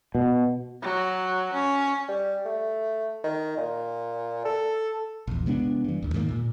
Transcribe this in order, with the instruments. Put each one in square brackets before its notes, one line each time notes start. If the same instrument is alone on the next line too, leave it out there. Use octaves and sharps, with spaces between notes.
[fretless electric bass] B2
[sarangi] F#3
C#4
[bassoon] G3
A3
D#3
A#2
A4
[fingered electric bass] A#1 E2
C3 G#3 B3 D4
G2 E3
A1 D#2
G#2 D#3 G3 A#3
A#2